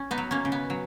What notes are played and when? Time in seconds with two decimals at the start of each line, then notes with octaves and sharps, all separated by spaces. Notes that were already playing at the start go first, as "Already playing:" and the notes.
Already playing: C#4
0.11 B3 D#4
0.18 F#3
0.31 A#3 C#4
0.45 C#3
0.52 B3
0.70 F#3